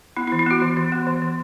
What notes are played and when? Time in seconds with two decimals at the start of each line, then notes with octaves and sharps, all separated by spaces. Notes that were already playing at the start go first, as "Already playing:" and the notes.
0.17 B3 E4
0.28 E4
0.32 E3
0.39 E4
0.46 B3 F#4
0.62 E3
0.77 E3
0.92 B3
1.07 E3
1.22 E3